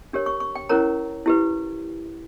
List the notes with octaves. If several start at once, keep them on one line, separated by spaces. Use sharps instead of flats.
D4 G4 A#4 C#5
C#6
C#6
G5
C#4 E4 A#4 C#5 A#5
E4 G4 B4